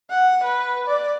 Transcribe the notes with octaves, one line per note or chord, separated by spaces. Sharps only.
F#5
B4
D5